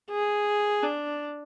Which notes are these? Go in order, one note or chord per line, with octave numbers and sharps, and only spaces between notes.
G#4
D4